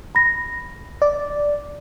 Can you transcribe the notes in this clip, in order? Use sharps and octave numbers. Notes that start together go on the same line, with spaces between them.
B5 A#6
D5